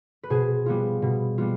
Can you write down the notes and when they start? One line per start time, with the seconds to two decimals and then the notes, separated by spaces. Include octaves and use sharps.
0.23 B4
0.30 B2 G#4 C5
0.66 G3 B3 F4
1.02 B2
1.38 G3 B3 F4